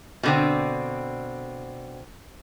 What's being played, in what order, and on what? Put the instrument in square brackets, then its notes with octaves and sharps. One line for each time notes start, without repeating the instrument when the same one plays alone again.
[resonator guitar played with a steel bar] B2 D3 C4